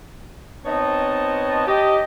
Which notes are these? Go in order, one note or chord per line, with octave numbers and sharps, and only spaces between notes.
B3 C4 D#4 C#5 D#5 A5
G4 D#5